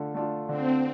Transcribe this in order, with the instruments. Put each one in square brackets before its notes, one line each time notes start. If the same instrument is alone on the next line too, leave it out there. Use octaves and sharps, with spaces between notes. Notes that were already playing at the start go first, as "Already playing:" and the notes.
Already playing: [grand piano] D3 A3 F4
A3 D4 F4
[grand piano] D3 [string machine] C4